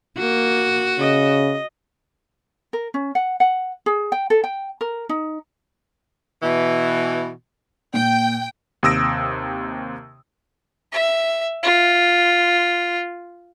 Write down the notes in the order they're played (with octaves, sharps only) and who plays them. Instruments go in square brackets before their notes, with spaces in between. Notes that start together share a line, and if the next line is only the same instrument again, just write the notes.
[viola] A#3 [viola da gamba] F#4
[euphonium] C#3 [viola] D#5
[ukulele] A#4
C#4
F#5
F#5
G#4
G5
A4
G5
A#4
D#4
[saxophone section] B2 E3
[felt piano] A#2 [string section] G5
[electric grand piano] D#2 C3 D#6 E6 A#6 D7
[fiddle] E5
F4